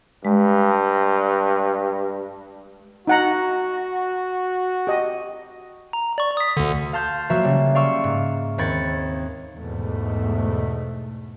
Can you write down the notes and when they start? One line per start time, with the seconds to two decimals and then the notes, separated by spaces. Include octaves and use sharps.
0.25 G2 G#3
3.07 D#4 F#4 F#5 A#5
4.87 G4 D#5
5.93 A#5
6.18 D5 C#6
6.37 D#6 B6
6.57 D2 D3
6.93 F5 A5 C6 G6
7.30 F3 F#3 A#3 F#4 E5
7.43 C#3 G3
7.75 D5 F5 C6 C#6 E6
8.04 G#2
8.58 D#2 C4 B5 G#6 A6 C#7
9.55 E2 G#2 B2 A3